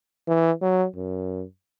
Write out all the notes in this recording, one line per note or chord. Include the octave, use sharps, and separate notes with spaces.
E3
F#3
F#2